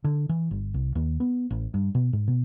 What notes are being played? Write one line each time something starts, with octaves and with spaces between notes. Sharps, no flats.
D3
E3
G1
C2
D#2
B3
A1
G2
B2
G#2
B2